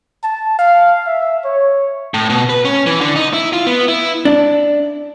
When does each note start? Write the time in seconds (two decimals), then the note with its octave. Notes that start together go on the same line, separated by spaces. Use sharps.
0.23 A5
0.59 F5
1.07 E5
1.44 C#5
2.14 A2
2.30 B2
2.50 B4
2.65 C#4
2.87 E3
3.01 D3
3.16 D#4
3.33 E4
3.53 F4
3.66 B3
3.88 E4
4.25 D4